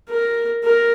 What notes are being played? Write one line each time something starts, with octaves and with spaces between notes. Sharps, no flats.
A#4
A#4